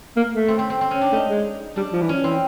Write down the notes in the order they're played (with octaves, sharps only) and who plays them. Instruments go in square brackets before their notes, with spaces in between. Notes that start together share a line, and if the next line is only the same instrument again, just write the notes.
[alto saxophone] A#3
A3
[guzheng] C4
C4
C4
C4
C#4
D4
[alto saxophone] A3 [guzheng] D#4
[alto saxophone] G#3
[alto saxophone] G3 [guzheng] D4
[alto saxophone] F3
E3
[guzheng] C#4
[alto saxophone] E3 [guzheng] C4